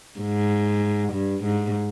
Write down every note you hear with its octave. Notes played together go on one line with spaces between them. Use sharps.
G#2
G2
G#2